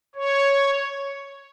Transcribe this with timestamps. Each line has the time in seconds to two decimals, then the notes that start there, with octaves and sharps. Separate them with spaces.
0.15 C#5